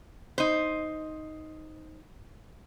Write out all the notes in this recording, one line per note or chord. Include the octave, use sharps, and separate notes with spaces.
D#4 C5